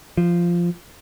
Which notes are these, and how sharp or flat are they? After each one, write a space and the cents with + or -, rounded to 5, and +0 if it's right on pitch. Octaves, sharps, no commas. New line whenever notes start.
F3 -10